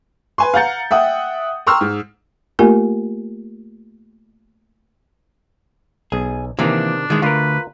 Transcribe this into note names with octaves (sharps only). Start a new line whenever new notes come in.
B4 G#5 C6
F5 F#5 A#5 G6 A6 C#7
E5 F#5 G5 D#6
G5 A#5 C6 C#6 E6 F6
G#2
A3 A#3 F4 G4 A#4 G#5
B1 G#4
C3 D#3 E3 A#3 D4
D#3 E3 G#3
D2 D3 F4 A#4 B4